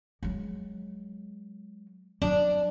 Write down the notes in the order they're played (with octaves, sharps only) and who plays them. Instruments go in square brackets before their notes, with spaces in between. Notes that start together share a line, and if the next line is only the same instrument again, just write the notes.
[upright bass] F#3 G#3
[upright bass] F#3 [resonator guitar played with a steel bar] D4